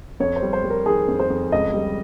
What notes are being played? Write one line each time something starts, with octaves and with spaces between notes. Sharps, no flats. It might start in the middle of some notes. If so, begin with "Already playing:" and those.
F2 C#5
C5
G3
C5
G3
A#4
D#3 G#4
F2
C5
F2
C#2 D#5
G3